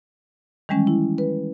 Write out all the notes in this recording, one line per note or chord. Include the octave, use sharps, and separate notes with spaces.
D#3 E3 G3 G#3 C#4
E4
B4